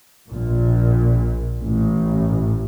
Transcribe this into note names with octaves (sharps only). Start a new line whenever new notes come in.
A#1 A#2
A1 A2